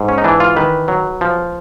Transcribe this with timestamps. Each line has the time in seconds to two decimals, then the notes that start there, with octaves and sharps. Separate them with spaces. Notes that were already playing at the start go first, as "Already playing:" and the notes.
Already playing: G#2
0.08 C#4
0.18 D#4
0.24 E3 D4
0.40 F4
0.56 D#3 B4
0.88 F#3
1.21 F3